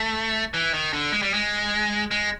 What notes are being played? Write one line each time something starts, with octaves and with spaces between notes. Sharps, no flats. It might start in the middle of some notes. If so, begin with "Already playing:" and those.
Already playing: A3
E3
D#3
D3
G#3
G3
G#3
G#3